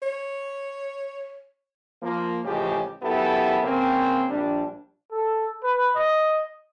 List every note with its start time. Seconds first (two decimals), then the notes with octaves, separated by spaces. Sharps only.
0.02 C#5
2.02 F3 A#3
2.44 A1 C#3 F3 G#3 G4
3.02 F#2 B3 E4 G4 A4
3.63 C#3 A#3 C4
4.29 A#1 G3 D4
5.11 A4
5.64 B4
5.95 D#5